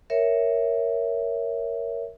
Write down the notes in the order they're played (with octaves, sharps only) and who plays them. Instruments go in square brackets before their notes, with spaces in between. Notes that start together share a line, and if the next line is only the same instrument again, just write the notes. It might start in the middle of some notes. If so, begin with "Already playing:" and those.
[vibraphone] A#4 C#5 E5